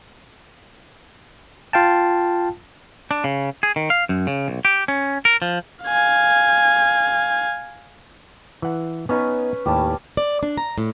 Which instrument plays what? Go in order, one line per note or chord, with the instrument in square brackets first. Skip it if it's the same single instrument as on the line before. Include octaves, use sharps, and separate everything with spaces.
[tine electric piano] F4 F5 G5 A5
[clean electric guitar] D4
C#3
G#4
D#3
F5
F#2
C#3
B1
G4
C#4
A#4
F3
[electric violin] F5 G#5
[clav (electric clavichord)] E3 F#5
[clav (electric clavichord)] B3 D#4 [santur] C#4 B4
[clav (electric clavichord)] D#2 A2 [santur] G3 A5
[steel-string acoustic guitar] D5
D4
A#5
A2